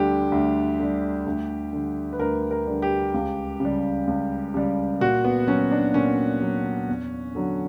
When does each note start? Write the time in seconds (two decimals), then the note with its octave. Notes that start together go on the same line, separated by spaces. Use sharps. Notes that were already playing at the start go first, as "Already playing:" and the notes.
Already playing: D2 D3 G3 G4
0.32 D2
0.79 D3 G3
1.26 D2
1.73 D3 G3
2.13 B4
2.19 D2 A#4
2.51 A#4
2.67 D3 G3
2.82 G4
3.14 C#2
3.60 C#3 G3
4.07 C#2
4.54 C#3 G3
5.01 A#2 F#4
5.24 B3
5.47 F#3 C#4
5.71 D4
5.94 A#2 C#4
6.42 F#3
6.88 E2
7.35 D3 F#3